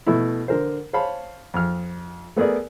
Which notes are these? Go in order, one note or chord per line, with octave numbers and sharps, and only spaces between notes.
B2 A3 E4
D3 A#4 C5
C5 C#5 F5 A5 B5
F2 F6
A3 B3 G#4 A#4 D5